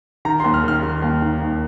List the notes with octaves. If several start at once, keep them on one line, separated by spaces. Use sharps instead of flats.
D#3 A#5
C6
D#2
F6
D#3 F6
D#3
D#2
D#3
D#2